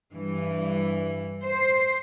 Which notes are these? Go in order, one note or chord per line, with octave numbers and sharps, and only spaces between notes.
G2 E3
C5